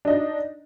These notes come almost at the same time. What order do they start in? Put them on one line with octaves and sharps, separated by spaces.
D4 D#5 D#4